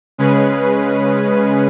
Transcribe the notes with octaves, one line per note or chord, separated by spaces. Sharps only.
C#3 G#3 C#4 G#4 B4